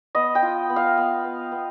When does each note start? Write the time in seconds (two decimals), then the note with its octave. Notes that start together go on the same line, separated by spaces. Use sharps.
0.15 B3 D#5
0.35 G5
0.42 F4
0.70 B3
0.76 F5
0.97 B3
1.25 B3
1.52 B3